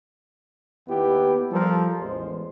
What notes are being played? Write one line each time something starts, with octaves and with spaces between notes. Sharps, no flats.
D#2 B3 E4 G4
F3 G3 A4 A#4
A1 E2 G#3 C5